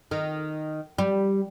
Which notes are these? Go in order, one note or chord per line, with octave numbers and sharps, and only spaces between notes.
D#3
G3